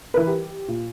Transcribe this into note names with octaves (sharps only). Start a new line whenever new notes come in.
E3 A#4 B4
G4
A#2